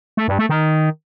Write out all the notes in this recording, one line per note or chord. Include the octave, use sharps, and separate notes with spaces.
A3
G2
A3
D#3